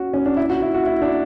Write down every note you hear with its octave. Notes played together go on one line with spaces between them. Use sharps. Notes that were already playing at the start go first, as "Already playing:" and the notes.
Already playing: C#4 F#4
C#4
D4
E4
F#4
E4
F#4
E4
D4